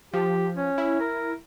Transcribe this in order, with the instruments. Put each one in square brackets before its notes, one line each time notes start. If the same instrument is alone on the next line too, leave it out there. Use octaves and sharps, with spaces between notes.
[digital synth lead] F3 [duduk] G4
[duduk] C#4
[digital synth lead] E4
[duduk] A#4